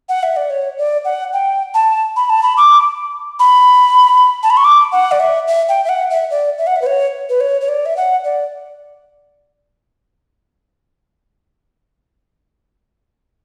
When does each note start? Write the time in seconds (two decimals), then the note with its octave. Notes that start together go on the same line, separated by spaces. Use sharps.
0.09 F#5
0.23 E5
0.37 D5
0.50 C#5
0.78 D5
1.05 F#5
1.33 G5
1.74 A5
2.16 B5
2.30 A5
2.43 B5
2.57 D6
3.40 B5
4.43 A5
4.50 B5
4.57 C#6
4.64 D6
4.92 F#5
5.12 D5
5.20 E5
5.48 E5
5.69 G5
5.85 E5
5.89 F#5
6.10 E5
6.31 D5
6.58 E5
6.67 F#5
6.76 E5
6.82 B4
6.86 C#5
7.29 B4
7.40 C#5
7.61 C#5
7.69 D5
7.86 E5
7.97 F#5
8.24 D5